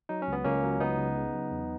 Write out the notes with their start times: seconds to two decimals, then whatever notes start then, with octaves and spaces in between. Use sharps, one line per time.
0.09 F#3 D#4
0.22 C#4
0.28 C#2 B3
0.44 C#2 A#3 C#4
0.63 F#3
0.80 C#2 B3 D#4
0.98 C#3
1.17 C#3
1.34 F#3
1.51 E2